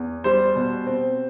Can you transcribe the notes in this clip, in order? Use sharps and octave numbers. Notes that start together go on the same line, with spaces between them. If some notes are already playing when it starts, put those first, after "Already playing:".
Already playing: E2
G3 C5
B2
C4